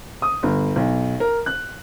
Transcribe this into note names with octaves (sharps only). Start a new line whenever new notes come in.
D#6
G1
B1
A#4
F#6